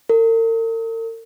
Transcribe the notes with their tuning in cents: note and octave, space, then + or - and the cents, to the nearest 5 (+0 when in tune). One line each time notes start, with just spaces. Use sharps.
A#4 -45